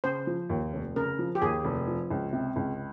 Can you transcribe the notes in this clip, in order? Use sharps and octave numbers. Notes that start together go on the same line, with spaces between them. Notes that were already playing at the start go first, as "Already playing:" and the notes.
C#3 C5
F3
D#2
F1
C#3 A#4
F3
G4
D#2 G#4
F1
F3
C#2
C3
C#2